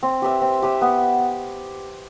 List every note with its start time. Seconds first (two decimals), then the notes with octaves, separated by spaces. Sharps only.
0.03 C4
0.22 G4 B4 E5
0.42 C4
0.62 G4 B4 E5
0.82 B3